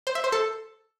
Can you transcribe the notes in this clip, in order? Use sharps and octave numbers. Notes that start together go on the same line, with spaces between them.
C5
E5
C5
A4